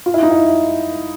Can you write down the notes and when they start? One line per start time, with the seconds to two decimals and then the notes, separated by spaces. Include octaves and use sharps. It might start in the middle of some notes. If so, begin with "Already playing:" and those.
0.06 F4
0.14 E4
0.23 D#4
0.31 E4